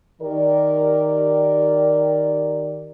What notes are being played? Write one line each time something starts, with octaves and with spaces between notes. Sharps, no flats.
D#3 G4 A#4 D5